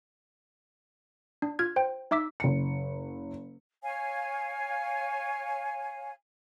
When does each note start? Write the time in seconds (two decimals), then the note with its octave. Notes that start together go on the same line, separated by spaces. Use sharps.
1.42 D4
1.59 F4 F6 G#6
1.76 C5 G5
2.11 D#4 E5 D6 E6 B6
2.40 F#1 C#7
3.83 C#5 F5 G#5